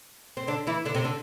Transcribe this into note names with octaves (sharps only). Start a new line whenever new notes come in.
C4
D3 D4
E3 E4
D3 D4
C3 C4
D3 D4